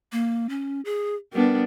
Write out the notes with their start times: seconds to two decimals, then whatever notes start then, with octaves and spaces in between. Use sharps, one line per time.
0.12 A#3
0.49 C#4
0.85 G#4
1.33 G3 B3 D4 A#4